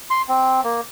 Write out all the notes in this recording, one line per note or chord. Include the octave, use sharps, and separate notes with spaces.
C6
C4
A#3